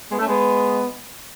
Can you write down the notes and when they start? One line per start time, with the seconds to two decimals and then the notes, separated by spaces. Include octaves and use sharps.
0.10 G#3 B3
0.19 A3 C#4
0.28 G#3 B3